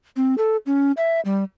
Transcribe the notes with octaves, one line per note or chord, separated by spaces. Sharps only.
C4
A4
C#4
E5
G3